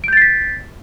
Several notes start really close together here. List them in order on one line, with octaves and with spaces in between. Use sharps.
D7 G6 A6 C7 B6